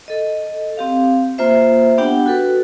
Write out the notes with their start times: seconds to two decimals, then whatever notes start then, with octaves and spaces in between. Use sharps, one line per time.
0.08 A4 D#5
0.77 C4 G4 F5
1.38 A#3 F4 C5 E5
1.98 B3 D4 G4 F#5 G5 B5
2.26 F#4 A4 B4